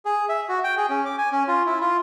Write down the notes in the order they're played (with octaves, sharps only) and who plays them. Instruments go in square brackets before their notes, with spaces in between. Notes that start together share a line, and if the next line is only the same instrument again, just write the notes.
[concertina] G#4
E5
F#4
G5
G#4
C#4
D6
G#5
C#4
F4
E4
F4